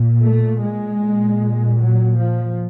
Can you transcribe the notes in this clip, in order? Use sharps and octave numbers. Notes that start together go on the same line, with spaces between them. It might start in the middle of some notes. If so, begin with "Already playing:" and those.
Already playing: A#2
A3
G#3
A#2
F#3
F3